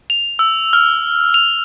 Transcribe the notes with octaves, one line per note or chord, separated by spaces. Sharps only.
F7
E6
F6
F7